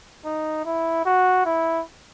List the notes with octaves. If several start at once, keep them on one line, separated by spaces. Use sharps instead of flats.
D#4
E4
F#4
E4